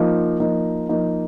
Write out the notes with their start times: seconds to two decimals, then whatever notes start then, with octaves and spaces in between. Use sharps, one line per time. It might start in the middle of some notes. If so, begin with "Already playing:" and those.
Already playing: F3 A#3 D#4
0.40 F3 A#3 D#4
0.89 F3 A#3 D#4